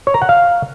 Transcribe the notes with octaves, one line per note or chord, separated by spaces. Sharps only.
C#5
A#5
F#5
F5